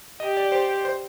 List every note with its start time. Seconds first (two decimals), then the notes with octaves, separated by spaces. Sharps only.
0.20 G4 D#5
0.37 D5
0.52 C5
0.85 C5